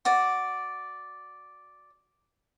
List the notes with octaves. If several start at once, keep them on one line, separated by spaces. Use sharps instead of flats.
F#4 D5